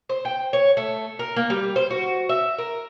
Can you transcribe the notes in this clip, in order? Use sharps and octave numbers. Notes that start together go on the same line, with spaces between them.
C5
G5
C#5
A3
A#4
A#3
G3
C5
F#4
E5
A#4